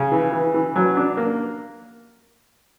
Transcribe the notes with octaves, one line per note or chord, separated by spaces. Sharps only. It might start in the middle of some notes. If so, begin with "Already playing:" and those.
Already playing: C#3
E3
E3
E3
F#3
D4
A#3